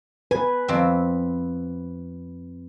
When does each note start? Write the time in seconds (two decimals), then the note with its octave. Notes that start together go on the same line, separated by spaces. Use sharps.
0.31 B4 G#5
0.68 F2 C4